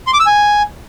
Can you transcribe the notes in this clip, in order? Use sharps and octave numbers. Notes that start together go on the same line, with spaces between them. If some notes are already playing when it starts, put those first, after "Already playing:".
C6
D6
E6
G#5